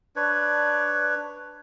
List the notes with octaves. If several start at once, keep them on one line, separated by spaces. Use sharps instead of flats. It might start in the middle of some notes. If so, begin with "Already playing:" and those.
D4 B4 C#5